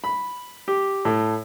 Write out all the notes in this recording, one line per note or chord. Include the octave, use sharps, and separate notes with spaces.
B5
G4
A2